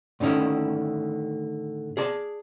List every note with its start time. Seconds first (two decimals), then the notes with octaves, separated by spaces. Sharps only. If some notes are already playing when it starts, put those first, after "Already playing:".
0.20 A2 D3 D#3 C#4 E4
1.97 G#4 D5 A5